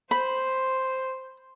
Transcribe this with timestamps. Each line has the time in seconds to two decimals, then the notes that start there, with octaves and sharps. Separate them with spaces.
0.11 C5 B5